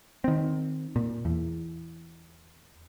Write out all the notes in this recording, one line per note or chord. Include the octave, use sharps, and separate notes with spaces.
D#3 C4
A#2
E2